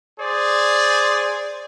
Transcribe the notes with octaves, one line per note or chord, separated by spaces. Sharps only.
G#4 C5 D5